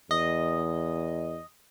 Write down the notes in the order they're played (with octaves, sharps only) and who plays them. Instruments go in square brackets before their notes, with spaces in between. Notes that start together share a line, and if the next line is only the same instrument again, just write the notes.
[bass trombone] E2 [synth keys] D#5